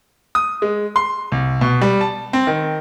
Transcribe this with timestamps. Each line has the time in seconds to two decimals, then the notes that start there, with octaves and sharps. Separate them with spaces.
0.35 D#6
0.62 G#3
0.96 C6
1.32 C2
1.61 B2
1.81 G3
2.01 A5
2.33 C4
2.47 D#3